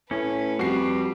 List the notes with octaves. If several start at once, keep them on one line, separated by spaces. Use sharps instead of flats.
A2 C#4 B4
F2 G3 F#4 C7